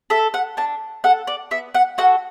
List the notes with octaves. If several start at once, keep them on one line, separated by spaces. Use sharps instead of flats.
A4 E5
F#5
D4 A5
A4 F#5
D5
B3 E5
F#5
F#4 A4 F#5